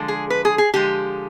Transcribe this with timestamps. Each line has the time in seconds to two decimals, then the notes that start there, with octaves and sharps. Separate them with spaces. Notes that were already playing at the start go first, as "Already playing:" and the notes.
Already playing: D3 F3 G#3
0.08 G#4
0.30 B4
0.45 G#4
0.58 G#4
0.73 D3 F3 G#3 G4